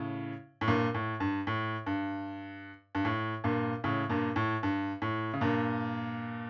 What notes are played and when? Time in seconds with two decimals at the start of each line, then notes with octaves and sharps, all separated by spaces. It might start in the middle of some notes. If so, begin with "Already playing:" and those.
Already playing: A2 C#3
0.61 A2
0.68 G2 A#2
0.94 A2
1.20 G2
1.47 A2
1.86 G2
2.95 G2
3.05 A2
3.44 G2 A#2
3.84 A2 C#3
4.09 G2 A#2
4.36 A2
4.63 G2
5.02 A2
5.34 C#3
5.41 G2 A#2